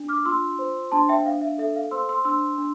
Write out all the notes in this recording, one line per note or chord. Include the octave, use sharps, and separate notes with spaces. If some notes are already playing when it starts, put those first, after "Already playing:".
Already playing: D4
D6 F6
F4 C6 E6
C5
D4 A5 C6
E5 G5
D4 F5
E5
A4 E5
F5
C5 C6 E6
C6 E6
D4 C6 E6
D4